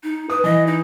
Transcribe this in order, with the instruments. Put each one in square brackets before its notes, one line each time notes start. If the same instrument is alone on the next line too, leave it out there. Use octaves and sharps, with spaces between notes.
[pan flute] D#4
[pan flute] B4 [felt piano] D#6
[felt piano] E3 [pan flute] D#5
[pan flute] D#4